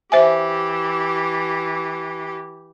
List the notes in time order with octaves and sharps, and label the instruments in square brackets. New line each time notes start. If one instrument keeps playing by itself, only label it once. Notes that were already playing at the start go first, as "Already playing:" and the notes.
[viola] E3 G4 [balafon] C5 E5 G#5